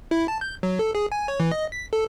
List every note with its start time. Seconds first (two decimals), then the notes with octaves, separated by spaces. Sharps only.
0.11 E4
0.28 A5
0.41 G6
0.63 F#3
0.79 A4
0.95 G#4
1.12 G#5
1.28 C#5
1.40 E3
1.51 D#5
1.72 B6
1.93 A4